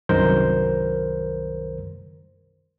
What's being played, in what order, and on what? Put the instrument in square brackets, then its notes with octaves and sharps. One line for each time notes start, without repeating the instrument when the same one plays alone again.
[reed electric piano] C2 F#2 D#3 A#4 C5 G6